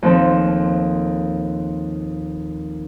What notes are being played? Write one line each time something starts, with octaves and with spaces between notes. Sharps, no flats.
D#2 A#2 F3 C4 A4